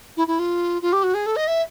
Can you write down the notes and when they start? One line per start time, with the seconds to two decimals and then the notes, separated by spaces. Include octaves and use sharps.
0.17 E4
0.28 E4
0.39 F4
0.82 F4
0.93 G4
1.03 F#4
1.14 G#4
1.26 A4
1.36 D#5
1.48 E5